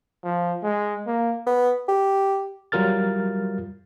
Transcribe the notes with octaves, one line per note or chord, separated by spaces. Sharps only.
F3
G#3
A#3
B3
G4
F#3 G3 F4 A#4 F6 A6